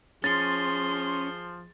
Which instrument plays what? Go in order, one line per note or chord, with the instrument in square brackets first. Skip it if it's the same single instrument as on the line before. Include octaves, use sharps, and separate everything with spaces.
[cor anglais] F3 [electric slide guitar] C#4 [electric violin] G#4 C6 [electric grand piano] A6